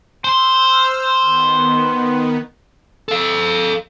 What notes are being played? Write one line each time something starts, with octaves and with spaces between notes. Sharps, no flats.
C5 C6 E6 F6 G6
D#3 B3
A4 F5